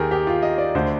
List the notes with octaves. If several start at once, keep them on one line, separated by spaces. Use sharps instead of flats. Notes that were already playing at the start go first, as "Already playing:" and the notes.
Already playing: D#2 D#3 D#4 G4 G#4 A#4
G4
F4
D#5
D5
D2 D3 C5